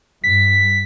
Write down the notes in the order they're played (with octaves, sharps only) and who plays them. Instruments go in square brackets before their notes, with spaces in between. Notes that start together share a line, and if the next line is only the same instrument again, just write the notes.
[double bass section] G2 [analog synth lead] B6